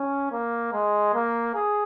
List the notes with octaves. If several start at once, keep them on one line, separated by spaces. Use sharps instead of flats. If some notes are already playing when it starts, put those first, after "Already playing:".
Already playing: C#4
A#3
G#3
A#3
G#4